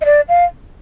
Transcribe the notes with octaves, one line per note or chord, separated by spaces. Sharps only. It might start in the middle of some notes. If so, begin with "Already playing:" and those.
D#5
D5
F5